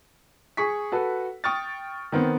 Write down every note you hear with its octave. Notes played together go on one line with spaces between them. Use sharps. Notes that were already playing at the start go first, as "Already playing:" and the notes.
G#4 C#6 B6
F#4 A4 B4
G5 C#6 D#6 F6 A6
D#3 B3 C4